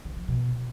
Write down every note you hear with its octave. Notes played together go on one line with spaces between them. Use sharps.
D#3
F3
B2